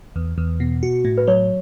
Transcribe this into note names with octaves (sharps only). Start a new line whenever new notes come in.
E2
E2
B2
F#4
A2
B4
F#3 C#5